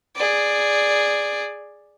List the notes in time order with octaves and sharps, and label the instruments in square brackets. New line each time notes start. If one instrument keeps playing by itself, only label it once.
[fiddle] G#4 D5